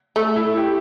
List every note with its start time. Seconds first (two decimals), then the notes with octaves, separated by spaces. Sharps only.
0.16 A3
0.36 E4
0.57 G4